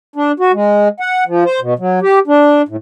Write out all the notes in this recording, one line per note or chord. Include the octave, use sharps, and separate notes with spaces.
D4
F#4
G#3
F#5
F3
C5
B2
F#3
G4
D4
A2